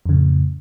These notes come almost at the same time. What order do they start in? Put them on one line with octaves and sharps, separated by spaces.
F2 C#3 A2